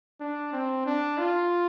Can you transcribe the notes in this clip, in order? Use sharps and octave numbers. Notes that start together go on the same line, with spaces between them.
D4
C4
D4
F4